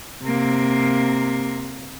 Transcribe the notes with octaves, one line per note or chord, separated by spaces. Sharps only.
C3 A#3